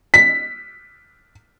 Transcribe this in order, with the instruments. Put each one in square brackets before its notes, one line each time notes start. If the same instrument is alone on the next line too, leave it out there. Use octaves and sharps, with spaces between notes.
[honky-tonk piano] B6